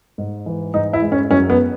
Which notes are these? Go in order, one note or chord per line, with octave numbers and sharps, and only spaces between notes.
G#2
E3
G#2 D#4
E4
G#3
C#4
F#2 C#4
B3